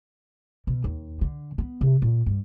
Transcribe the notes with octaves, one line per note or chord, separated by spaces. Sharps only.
B2
D#2
D3
B3
C3
A#2
G2